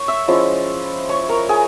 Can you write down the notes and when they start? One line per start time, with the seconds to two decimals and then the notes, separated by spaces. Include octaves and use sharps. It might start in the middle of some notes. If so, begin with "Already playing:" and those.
Already playing: C#5 C#6
0.08 E5 E6
0.28 F3 G#3 C#4 E4
1.09 C#5 C#6
1.29 A#4 A#5
1.49 G#4 G#5